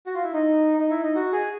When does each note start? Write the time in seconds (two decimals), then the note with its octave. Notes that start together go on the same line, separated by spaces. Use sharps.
0.06 F#4
0.14 F4
0.24 E4
0.33 D#4
0.79 D#4
0.90 E4
1.03 D#4
1.15 F#4
1.33 G#4